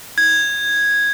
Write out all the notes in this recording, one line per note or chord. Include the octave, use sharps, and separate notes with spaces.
G#6